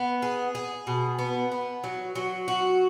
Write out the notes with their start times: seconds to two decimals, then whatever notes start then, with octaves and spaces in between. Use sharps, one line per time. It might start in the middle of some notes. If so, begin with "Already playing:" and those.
Already playing: B3
0.22 G#4
0.55 G#4
0.87 B2
1.19 B3
1.52 B3
1.84 F#3
2.15 F#3
2.48 F#4